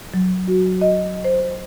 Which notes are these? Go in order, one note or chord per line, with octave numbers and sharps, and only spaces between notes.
F#3
F#4
D#5
C5